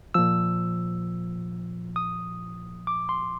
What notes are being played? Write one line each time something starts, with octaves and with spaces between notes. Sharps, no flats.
A#2 F3 E6
D#6
D6
C6